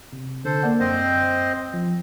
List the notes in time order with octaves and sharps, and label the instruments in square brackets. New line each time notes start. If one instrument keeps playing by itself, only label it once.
[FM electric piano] C3
[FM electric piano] D3 [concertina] A4 C5
[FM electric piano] A#3 D5 F#5
[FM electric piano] F#2 [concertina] C4 C5 D#5
[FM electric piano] F3